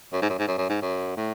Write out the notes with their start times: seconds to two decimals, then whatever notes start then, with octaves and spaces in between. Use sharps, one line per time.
0.13 F#2
0.22 G#2
0.29 F#2
0.39 G#2
0.48 F#2
0.58 F#2
0.69 G#2
0.82 F#2
1.17 A2